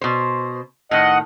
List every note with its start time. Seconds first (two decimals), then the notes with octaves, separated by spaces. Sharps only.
0.01 B2 C5
0.91 A2 D#3 D#5 F#5